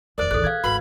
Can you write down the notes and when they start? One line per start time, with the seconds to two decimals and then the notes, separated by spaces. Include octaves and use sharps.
0.18 F1 D#2 A#4 C5 D5
0.31 A1 D#2 G#4 A4 F#6
0.44 B3 F5 G#6
0.64 G#1 D2 F#4 B4 F#5 B5